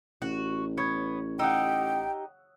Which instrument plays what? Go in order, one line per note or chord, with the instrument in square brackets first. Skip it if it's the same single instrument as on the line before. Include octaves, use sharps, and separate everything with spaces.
[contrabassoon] A1 [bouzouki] F#4
[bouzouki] B3 [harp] C#5 G#6
[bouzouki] D#4 G4 [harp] F#5 D#6 E6 [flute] G5